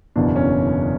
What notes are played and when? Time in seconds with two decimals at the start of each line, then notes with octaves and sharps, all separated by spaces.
0.16 F#1 E2 B2 D4
0.36 C#4